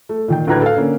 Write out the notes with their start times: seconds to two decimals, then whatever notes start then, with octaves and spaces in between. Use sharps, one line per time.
0.09 A3
0.28 A#2 D#3 G5
0.47 D2 A2 B4 A#5 F#6 G#6
0.62 A4 F5
0.76 D3 A#3 C#4